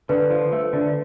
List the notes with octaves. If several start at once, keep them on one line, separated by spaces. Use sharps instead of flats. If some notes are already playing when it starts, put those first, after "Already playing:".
D3 B4
F3
A3
D3